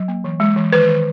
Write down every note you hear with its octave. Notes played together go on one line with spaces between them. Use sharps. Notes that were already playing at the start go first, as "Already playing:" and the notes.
Already playing: F#3
A#3
E3
G#3
E3
D#3 B4
D#3